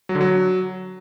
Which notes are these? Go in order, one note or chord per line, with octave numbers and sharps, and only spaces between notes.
F#3
D3
F#3